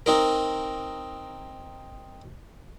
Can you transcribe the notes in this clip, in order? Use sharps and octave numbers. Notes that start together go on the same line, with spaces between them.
C4 D#4 A#4